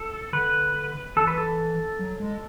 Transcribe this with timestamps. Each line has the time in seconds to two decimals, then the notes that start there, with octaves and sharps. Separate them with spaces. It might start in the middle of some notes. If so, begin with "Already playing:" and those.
Already playing: A4
0.33 D3 B4
1.16 E3 A4
1.27 B4
1.38 A4
1.99 F#3
2.20 G#3